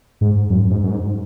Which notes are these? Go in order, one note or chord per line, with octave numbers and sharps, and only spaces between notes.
G#2
F#2
G#2
F#2
G#2